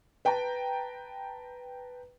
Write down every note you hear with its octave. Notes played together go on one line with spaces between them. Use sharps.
B4 G5 A5 A#5